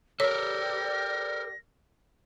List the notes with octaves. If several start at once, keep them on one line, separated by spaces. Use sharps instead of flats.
G4 A4 A#4 C#5 D5 A#6